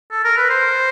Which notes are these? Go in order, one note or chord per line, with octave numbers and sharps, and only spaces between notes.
A4
A#4
B4
C5